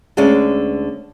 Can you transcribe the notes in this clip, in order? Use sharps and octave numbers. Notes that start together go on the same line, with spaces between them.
D2 D3 G#3 C#4 D5